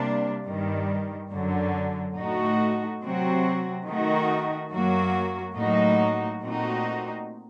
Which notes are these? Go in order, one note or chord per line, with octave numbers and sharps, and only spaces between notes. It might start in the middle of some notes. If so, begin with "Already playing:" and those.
Already playing: C3 G3 A#3 D4
G2 D#3 G3
F#2 D3 F#3
A2 A3 D#4 F#4
C3 F#3 C4 F#4
D#3 A3 D#4 F#4
F#2 F#3 A#3 F#4
A2 F#3 A#3 D#4 F#4
A#2 A3 C4 D#4 F#4